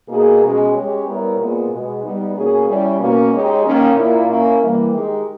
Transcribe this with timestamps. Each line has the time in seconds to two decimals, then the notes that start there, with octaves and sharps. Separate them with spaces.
0.08 B2 A#3 D#4 G#4
0.41 B2 G#3 C#4
0.73 G#3 C#4 G4 C#5
1.05 G3 B3 E4 A#4 C#5
1.37 A#2 G#3 B3
1.70 B2 G#3 B3
2.03 G3 B3 D#4
2.34 B2 A#3 C#4 G#4
2.67 G3 C#4 E4
2.99 B2 A#3 C#4
3.31 G#3 D#4 G4 C#5
3.63 D#3 A#3 C#4
3.95 A#2 A#3 E4
4.27 A#3 C#4 E4
4.61 E3 G3 A#3
4.92 D#3 G#3 D#4 G4